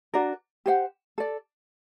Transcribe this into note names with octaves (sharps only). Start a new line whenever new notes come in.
D4 F#4 A#4 D5
G4 C5 F#5
A4 D5